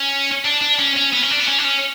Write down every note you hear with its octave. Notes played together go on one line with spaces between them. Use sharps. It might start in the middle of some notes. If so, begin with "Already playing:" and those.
Already playing: C#4
D4
D4
C#4
C#4
B3
C#4
D4
B3
C#4
D4
C#4